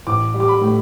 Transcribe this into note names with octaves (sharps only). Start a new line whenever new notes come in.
A1 D6
G3
D6
B5
A2